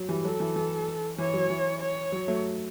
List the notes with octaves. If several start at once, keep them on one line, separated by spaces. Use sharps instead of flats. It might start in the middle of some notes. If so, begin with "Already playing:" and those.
Already playing: F#3
E3 G3
F#3 A4
E3
E3
E3 C#5
F#3
E3
C#5
F#3
F#3 A3